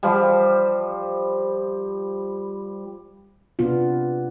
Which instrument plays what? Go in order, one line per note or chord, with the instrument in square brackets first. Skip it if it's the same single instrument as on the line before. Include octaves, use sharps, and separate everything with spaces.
[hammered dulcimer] F3 G3
[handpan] C3 B3 D4 F4